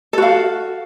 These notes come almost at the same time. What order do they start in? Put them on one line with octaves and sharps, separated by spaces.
A4 F#4 F5